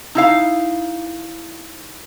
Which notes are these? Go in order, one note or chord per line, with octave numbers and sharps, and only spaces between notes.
D#4 E4 F5